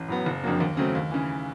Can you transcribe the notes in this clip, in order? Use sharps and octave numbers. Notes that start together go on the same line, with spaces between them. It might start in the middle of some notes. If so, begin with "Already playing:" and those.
Already playing: A1
A2 F#3 B3
F#1
F2 D3 F#3 A#3
D#2
C#3 F#3 A3 C4
D#2
C#3 E3